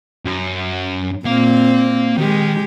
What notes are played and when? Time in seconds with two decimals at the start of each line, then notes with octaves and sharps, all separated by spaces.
0.26 F#2
1.25 A#2 A#3 C4 F5
2.18 D#3 G#3 G4